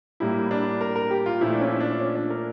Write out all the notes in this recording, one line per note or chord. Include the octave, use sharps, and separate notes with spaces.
A2 G3 A#3 E4
D4
A#4
A#4
G4
F4
A#2 F3 A3 E4
D4
C#4
E4
D4
C#4
D4
A#4